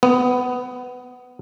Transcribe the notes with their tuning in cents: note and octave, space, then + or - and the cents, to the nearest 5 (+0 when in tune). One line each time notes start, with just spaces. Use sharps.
B3 +15